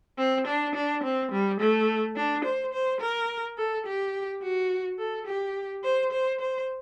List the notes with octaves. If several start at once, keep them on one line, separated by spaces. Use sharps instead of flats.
C4
D4
D4
C4
G3
A3
D4
C5
C5
A#4
A4
G4
F#4
A4
G4
C5
C5
C5